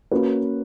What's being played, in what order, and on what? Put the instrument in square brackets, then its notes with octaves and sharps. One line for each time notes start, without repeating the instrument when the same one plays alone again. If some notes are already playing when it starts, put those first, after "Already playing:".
[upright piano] A#3 C#4 F#4 B4